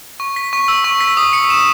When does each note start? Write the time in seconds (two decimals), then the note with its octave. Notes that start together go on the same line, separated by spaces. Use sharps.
0.20 C#6
0.36 B6
0.53 C#6
0.68 E6
0.84 C#6
1.01 B6
1.17 D#6
1.33 C#7
1.50 E7